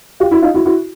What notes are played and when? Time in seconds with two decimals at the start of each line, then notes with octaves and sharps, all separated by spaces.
0.20 F4 G4
0.31 E4 F#4
0.42 D#4 F4
0.54 E4 F#4
0.65 E4 F#4